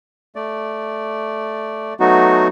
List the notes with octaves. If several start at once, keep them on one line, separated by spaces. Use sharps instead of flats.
A3 D5
F#3 A3 B3 D#4 F#4